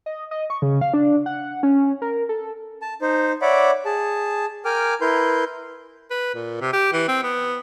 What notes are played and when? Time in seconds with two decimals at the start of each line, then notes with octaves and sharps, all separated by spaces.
0.06 D#5
0.31 D#5
0.50 C#6
0.62 C#3
0.81 F5
0.94 D4
1.26 F#5
1.63 C#4
2.02 A#4
2.29 A4
2.82 A5
3.02 D#4 C5
3.42 C#5 D5 E5 F#5 B5 D6
3.85 G#4 A5
4.65 A#4 G5 G#5 D6 F6
5.01 E4 A#4 B4 C6 G6
6.10 B4
6.35 A#2
6.61 C3
6.73 G4
6.93 E3
7.08 C4
7.23 B3